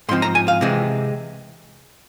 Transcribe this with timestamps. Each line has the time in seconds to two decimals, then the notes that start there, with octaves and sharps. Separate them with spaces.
0.09 G#2 F3 C4 C6
0.22 A#5
0.35 G#5
0.48 F5
0.61 C3 E3 G#3 C4